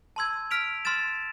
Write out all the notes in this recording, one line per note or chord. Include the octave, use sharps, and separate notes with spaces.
A5 C6 E6 G#6
F6 B6 D7 F7
C6 F6 A6 E7